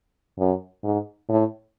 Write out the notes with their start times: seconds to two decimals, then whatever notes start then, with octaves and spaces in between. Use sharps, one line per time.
0.39 F#2
0.84 G#2
1.29 A2